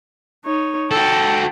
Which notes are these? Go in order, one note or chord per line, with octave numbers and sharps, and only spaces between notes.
D#4 C#5
F#4 A4 G5 A5